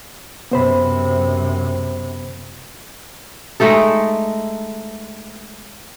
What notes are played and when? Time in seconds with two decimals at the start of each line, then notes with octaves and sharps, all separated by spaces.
0.51 F#2 C3 B3 C5 B5
3.60 G#3 A3 D#4 A4